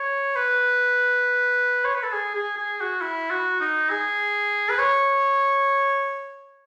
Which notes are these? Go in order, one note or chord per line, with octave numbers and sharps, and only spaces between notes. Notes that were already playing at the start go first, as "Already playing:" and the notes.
Already playing: C#5
B4
C#5
B4
A4
G#4
G#4
G#4
F#4
E4
F#4
D#4
G#4
B4
C#5